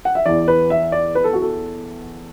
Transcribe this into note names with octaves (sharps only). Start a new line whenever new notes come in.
F#5
E5
E2 E3 D5
B4
E5
D5
B4
A4
F#4
A4